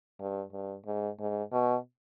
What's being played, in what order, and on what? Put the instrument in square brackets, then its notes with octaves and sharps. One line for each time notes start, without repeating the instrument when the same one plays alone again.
[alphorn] G2
G2
G#2
G#2
B2